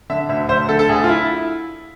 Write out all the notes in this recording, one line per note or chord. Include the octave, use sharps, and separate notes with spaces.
D3 E5
D2 E5
D2 C5
D3 A4
A4
D2 G#4
F4
E4